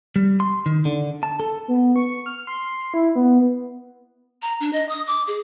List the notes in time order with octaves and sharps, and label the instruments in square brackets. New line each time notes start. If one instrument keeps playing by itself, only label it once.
[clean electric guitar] G3
C6
D#3
D3
A5
A4
[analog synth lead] B3
C#6
F6
C6
E4
B3
[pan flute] A#5
D4
D#5
D#6
D6
G#4